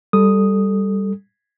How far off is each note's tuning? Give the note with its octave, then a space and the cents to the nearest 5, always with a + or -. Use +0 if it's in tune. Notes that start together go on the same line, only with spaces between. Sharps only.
G3 +0 A4 +0 D#6 +0